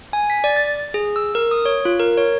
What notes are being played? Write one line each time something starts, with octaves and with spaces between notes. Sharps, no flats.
G#5
B6
D5
A6
G#4
E6
A#4
D#6
C#5
F4
A#4
C#5